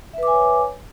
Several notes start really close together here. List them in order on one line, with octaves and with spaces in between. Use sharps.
E5 B4 D6 G#5 C#5